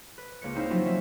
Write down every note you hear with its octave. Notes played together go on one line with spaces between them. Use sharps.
B4
C#2 A#3 C#5 C#7
C4 D#4 E4 C5 F5
F3 F#3 C4 E4 F4
C#4 E5